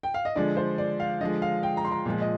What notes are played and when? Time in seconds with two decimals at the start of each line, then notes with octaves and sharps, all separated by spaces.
0.03 G5
0.14 F5
0.25 D#5
0.36 D3 F3 G#3 D5
0.57 C5
0.78 D5
1.00 F5
1.21 D3 F3 G#3 D#5
1.42 F5
1.63 G5
1.77 A#5
1.85 C6
1.91 A#5
2.06 A#2 F3 G#3
2.21 D#5